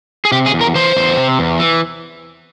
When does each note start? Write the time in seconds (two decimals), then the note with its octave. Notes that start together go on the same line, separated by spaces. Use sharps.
0.25 G#4
0.32 C3 G4
0.46 G#4
0.54 E2
0.61 A#4
0.75 E3 C5
0.96 E2
1.17 C3
1.39 E2
1.59 E3